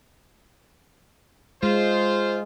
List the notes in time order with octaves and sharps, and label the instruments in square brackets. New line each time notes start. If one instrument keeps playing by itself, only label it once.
[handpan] G#3 [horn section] F4 C5